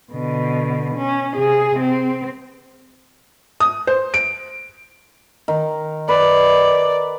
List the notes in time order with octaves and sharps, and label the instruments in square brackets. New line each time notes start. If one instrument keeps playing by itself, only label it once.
[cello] B2 D3
C#4
C3 G#4
C4
[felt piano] D#6
C5
D7
[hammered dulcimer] D#3
[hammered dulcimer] B4 [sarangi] D5